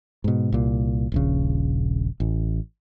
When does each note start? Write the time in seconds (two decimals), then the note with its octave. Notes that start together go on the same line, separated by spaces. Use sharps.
0.24 G#2 B2
0.52 C2 A#2
1.12 D#1 A#1 C#3
2.20 A1